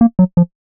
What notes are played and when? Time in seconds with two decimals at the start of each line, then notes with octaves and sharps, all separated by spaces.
0.01 A#3
0.19 F#3
0.37 F3